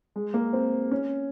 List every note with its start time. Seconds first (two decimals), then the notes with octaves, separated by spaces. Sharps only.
0.16 G#3
0.34 A#3
0.53 C4
0.91 C#4